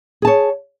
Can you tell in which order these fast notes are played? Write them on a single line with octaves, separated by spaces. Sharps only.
G#4 A5 C#5